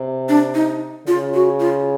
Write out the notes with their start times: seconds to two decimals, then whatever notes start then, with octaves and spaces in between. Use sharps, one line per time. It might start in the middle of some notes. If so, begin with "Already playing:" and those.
Already playing: C3
0.29 D4
0.55 D#4
1.07 C#3 F4
1.34 F#4
1.60 F4